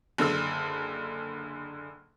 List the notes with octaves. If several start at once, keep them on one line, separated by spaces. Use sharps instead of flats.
F#1 D3 A4 E6